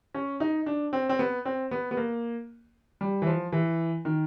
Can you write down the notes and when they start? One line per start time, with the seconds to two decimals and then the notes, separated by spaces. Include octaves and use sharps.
0.14 C#4
0.40 D#4
0.66 D4
0.93 C4
1.09 C4
1.19 B3
1.45 C4
1.71 B3
1.91 B3
1.97 A#3
3.01 G3
3.22 E3
3.27 F3
3.52 E3
4.05 D#3